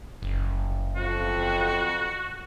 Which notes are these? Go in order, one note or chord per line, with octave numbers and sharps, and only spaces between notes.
F#1
F2 F#4